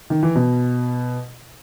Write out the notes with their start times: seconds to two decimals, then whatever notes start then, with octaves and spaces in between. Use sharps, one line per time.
0.10 D#3
0.23 E3
0.35 B2